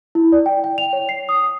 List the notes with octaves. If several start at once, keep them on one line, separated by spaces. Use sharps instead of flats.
E4
D5
G5
G5
F7
C#5
C7
D#6